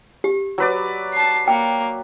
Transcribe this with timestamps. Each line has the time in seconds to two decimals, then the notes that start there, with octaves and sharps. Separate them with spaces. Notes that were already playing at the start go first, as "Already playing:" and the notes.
0.24 G4
0.58 F#3 B4 D5
1.13 A5 C7
1.48 A#3 G5